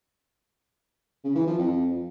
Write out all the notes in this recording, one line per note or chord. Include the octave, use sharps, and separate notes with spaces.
C#3
E3
F3
F2